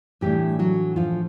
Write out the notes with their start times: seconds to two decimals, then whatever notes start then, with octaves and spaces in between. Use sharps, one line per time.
0.21 A2 E3 G3 A3 D4 G4
0.59 F#3 F#4
0.96 F3 F4